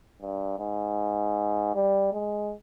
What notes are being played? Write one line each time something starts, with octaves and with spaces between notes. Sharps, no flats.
G2
G#2
G3
G#3